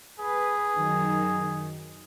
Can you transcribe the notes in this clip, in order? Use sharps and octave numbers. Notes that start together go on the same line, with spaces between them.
G#4 B4
F#2 D#3 F#3